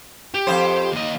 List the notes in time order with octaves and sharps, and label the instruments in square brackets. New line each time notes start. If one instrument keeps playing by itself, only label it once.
[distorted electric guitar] G4
[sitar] F2 A2 C5
[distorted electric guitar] D#2 D#5